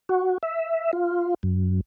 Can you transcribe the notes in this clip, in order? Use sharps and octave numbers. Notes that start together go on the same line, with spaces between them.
F#4
E5
F4
F#2